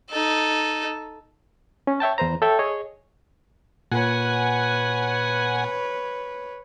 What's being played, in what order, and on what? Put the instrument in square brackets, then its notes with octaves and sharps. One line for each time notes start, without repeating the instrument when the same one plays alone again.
[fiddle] D#4 A4
[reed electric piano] C#4
C#5 E5 G5 A5
E2 B4 C5 A#5
A4 C#5 E5 G5
G#4 C#5 D#5
[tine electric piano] A#2 [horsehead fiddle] B4 C#5 [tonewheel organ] F#5 G#5